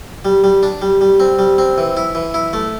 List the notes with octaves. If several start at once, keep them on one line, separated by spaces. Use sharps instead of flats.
G3
G3
D4
G3
G3
C4
G3
C4
E3
E4
E3
E4
A3